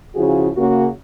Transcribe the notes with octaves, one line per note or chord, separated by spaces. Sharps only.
C#3 F3 E4 F#4 G#4
C#3 A#3 F#4